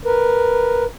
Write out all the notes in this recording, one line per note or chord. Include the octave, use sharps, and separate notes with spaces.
A#4 B4